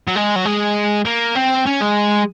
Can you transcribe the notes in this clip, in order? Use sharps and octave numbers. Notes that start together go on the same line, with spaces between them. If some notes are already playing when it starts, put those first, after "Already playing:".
F#3
G#3
F#3
G#3
A#3
C4
C#4
G#3